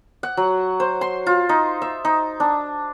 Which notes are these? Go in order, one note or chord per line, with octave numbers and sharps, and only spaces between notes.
F#5
F#3
C5
C6
F4
D#4
E5
D#4
D4